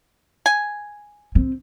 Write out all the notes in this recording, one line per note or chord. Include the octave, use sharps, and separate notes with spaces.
G#5
C4